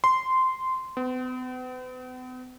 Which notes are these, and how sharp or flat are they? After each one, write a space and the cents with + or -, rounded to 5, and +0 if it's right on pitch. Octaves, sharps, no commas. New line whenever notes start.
C6 -15
B3 +45